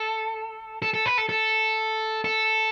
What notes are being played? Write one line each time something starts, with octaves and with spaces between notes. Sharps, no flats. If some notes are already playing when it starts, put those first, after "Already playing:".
Already playing: A4
A4
A4
B4
A4
A4
A4